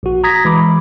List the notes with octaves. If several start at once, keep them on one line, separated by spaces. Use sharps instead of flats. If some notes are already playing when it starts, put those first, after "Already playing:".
A#1 F#4
A#5 D#6 G#6 A#6 B6
E3 G#3 B5 D6